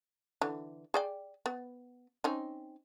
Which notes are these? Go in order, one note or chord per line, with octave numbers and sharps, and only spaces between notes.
D3 E3
G#4 D5 G5
B3
C4 C#4 D#4